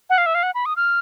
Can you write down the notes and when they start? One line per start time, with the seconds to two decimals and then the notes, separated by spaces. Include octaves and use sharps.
0.10 F#5
0.18 F5
0.26 E5
0.35 F5
0.43 F#5
0.55 B5
0.66 D#6
0.76 F6